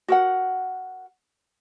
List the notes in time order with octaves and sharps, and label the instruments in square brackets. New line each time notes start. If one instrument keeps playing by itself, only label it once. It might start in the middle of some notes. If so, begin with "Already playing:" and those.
[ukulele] F#4 A#4 F#5